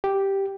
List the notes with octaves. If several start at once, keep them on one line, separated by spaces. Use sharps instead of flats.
G4